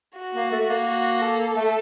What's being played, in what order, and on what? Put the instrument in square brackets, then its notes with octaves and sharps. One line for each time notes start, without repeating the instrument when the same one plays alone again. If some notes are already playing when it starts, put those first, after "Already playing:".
[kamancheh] F#4
[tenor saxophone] A#3
A3
A#3
[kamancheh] F#4
A4
[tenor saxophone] A3